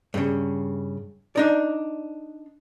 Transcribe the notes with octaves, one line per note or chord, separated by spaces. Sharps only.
G2 C#3
D4 D#4 D5